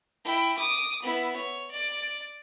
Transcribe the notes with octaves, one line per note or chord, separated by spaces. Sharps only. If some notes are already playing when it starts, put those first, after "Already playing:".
E4 G5
D6 D#6
B3 E4
C#5
D5